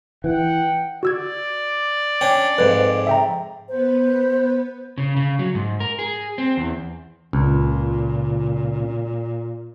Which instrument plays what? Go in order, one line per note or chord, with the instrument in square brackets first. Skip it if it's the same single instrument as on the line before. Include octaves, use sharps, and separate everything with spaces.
[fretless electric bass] E3 [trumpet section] F#5 G5
[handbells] F#4 E6 G#6 [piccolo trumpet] D5
[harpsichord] C#4 D4 [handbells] G5
[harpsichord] F2 G#2 [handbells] B4
[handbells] E5 G5 A#5
[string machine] B3 B4 [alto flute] C5
[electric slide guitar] C#3
C#3
F#3
G#2
A#4
G#4
C4
E2
[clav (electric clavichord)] C#2 [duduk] A#2